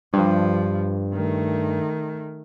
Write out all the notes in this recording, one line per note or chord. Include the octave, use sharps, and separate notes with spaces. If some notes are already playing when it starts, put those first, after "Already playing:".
G2 F3
D#3 A3